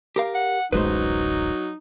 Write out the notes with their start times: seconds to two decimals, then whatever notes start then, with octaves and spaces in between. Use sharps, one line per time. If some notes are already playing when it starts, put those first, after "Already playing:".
0.16 G4 A#4 F5
0.34 F#5
0.72 D1 A1 F#3 G#3 D#4 B4 C5